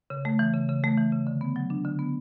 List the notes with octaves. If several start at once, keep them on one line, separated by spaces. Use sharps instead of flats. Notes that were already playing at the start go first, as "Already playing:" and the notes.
C#3
A3
E3
C#3
C#3
A3
E3
C#3
D3
B3
F#3
D4
D3
B3